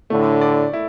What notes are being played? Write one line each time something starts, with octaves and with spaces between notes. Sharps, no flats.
A2 D3 A3
D5
E4